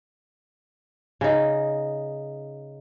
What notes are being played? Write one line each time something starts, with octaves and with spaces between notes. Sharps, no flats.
C#3 D#4